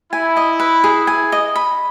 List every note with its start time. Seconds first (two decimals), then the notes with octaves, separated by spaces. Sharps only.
0.13 E4 G#5
0.37 D#5
0.60 B4
0.84 G#4
1.07 G#5
1.32 D#5
1.56 B5